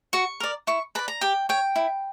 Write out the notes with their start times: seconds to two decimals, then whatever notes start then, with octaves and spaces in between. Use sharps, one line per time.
0.13 F#4 C#6
0.40 A#4 D5
0.67 E4 C#6
0.95 B4 A#5
0.99 D5
1.08 A#5
1.21 G4 G5
1.49 C#5 G5
1.76 E4